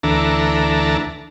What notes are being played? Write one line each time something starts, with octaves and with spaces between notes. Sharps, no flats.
D2 E3 D4 A4 A#5